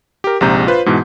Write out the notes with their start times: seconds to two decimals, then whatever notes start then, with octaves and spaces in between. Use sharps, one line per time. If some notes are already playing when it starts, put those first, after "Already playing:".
0.24 G4 A#4
0.41 A#1 G#2 C3 A#5 G6
0.67 F4 B4 C5
0.86 G#2 B2 E3